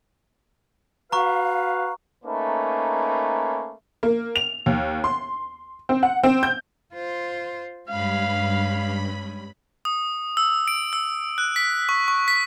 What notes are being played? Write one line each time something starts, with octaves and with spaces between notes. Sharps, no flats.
F#4 B4 F5 A#5 C#6
A3 A#3 C#4 D#4 B4
A#3
F7
D#2
C6
C4
F#5
C4
G6
F4 C5
G2 G#3 C#4 F5 B5
D#6
E6
D7
E6
F#6
B6
C#6
C#6
B6